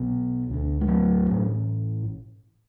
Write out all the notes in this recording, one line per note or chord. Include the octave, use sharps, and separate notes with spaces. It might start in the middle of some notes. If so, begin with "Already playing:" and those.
Already playing: B1 B2 B3
D2 D3
G#3
F#3 A3
A1 A2